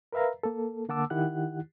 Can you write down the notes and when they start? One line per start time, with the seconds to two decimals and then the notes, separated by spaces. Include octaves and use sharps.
0.13 A#4 B4 E5 F5 A#5
0.43 A#3 A4
0.89 D3 A#3 F#5 A5 D6 E6
1.10 D#3 E4 G4 F#5 F#6